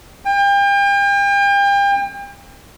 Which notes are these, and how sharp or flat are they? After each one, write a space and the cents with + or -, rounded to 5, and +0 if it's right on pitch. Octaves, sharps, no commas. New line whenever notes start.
G5 +35